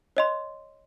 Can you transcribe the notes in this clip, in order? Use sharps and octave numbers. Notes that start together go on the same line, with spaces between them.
C#5 D#5 C6